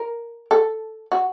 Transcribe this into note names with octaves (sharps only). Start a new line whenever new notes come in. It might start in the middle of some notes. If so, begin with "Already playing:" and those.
Already playing: A#4
A4
F#4